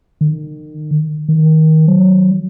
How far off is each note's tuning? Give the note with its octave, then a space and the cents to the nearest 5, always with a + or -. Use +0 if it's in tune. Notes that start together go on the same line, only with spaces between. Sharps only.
D#3 -35
D#3 +20
F#3 +15